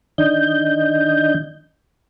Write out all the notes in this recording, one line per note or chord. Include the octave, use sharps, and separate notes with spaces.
D#3 D4 D#5 G6